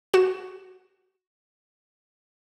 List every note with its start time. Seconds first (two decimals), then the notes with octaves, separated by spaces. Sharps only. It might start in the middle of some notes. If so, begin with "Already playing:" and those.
0.13 F#4 E7